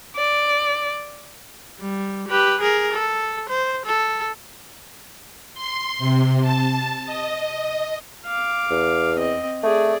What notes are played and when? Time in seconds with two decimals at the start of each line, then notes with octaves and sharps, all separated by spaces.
0.16 D5
1.80 G3
2.28 G4 B4
2.61 G#4 A#4
2.93 A4
3.49 C5
3.86 A4
5.54 C6
5.98 C3
6.42 A5
7.05 D#5
8.26 F5 D6
8.70 E2
9.16 C4 D#5
9.63 A3 G#4 D5